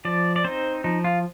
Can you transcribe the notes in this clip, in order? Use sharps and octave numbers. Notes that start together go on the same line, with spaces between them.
F3 D5
D5
C4 D#4 C5
F3 D#4
F4